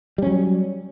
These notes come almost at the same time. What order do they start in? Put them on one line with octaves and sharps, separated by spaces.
G3 C#4 F#3